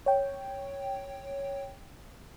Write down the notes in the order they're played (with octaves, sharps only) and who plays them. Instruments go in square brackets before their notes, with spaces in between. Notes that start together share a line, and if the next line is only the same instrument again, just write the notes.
[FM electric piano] C#5 G5